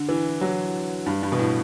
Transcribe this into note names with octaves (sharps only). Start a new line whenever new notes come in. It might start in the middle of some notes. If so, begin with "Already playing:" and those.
Already playing: D3
E3
F#3
G2
G2
B2
A2